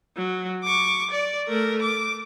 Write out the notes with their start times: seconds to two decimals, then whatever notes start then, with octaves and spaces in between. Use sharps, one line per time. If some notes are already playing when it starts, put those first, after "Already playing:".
0.16 F#3
0.64 C#6 D6
1.11 D5
1.48 A3 A#4
1.82 D6